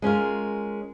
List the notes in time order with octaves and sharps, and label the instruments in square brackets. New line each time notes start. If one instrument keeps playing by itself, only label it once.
[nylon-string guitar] G#3 C#4 F4 A#4